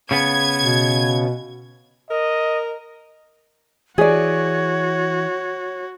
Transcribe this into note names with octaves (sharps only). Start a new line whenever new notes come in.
C#3 B3 G#6
B2
A#4 D#5
E3 F#4 G#4 C#5 D5